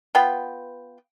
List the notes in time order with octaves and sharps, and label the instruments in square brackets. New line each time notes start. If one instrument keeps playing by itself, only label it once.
[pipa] B3 F4 G5 B5